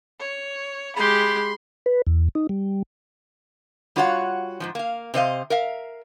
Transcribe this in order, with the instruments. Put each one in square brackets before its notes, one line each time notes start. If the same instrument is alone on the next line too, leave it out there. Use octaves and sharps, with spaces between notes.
[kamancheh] C#5
[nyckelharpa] G#3 G4 [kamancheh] B5 C6
[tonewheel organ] B4
E2
D#4
G3
[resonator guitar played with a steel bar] G3 F4 F#4 C#5 F5 F#5
G#2 B2 F3
A#3 F5
C3 C5 D#5 F5
A#4 E5 F5